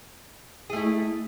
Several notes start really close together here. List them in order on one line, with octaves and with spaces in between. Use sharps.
G#4 A3 E4